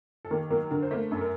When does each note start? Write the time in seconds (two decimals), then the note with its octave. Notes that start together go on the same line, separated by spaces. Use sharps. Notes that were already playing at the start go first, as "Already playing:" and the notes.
0.25 A4
0.31 D#2 A#3 A#4
0.50 F#3 A#3 A#4
0.71 D3 A#4
0.83 C5
0.91 A3 A#3 A#4
1.11 F#2 A4
1.21 A#4